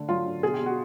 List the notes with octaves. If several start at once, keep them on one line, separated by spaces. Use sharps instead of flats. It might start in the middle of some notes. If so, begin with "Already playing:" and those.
Already playing: D3 A3
F#3 F4
D3
B2 G#4
G4
B2
F#4